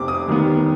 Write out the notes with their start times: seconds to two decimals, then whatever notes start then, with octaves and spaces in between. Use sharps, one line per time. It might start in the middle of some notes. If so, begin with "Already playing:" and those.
Already playing: F1 F2 C3 D6
0.08 D#6
0.28 D#2 D#3 G3 B3